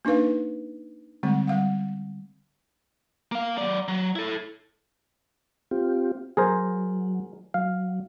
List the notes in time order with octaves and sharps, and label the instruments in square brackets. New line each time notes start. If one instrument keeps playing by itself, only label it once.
[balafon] A#3 D4 D#4 B4 F5
D3 G3 G#3 C4
G3 F5 F#5
[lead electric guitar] A#3 F5
F#3 D5
F#3
E4 A4
[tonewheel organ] C4 F4 G4
[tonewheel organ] F#3 [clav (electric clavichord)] G#4 A#4 C5
[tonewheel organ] F#3 [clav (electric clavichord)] F5